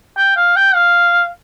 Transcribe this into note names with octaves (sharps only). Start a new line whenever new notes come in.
G5
F5
G5
F5